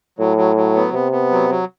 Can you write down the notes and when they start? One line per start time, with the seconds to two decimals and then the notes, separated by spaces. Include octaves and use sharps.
0.19 A2 F#3
0.37 F#3
0.56 F#3
0.75 B3
0.93 C3 B3
1.12 B3
1.31 F#3
1.50 F#3